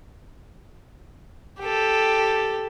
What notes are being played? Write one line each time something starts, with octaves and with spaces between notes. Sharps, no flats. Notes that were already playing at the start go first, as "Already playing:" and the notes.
G4 A4